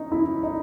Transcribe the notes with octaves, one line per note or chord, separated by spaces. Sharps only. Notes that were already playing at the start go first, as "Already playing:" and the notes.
Already playing: C#4 D#4
E4
D#4